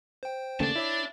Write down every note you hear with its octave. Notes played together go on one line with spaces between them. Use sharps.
C5 G5
D#2 C#3 A3 D5 A5
E4 C#5 E5 D6